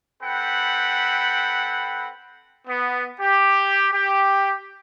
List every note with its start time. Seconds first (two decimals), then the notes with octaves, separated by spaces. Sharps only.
0.23 C4 A4 B4 F#5 G5 B5
2.67 B3
3.21 G4
3.93 G4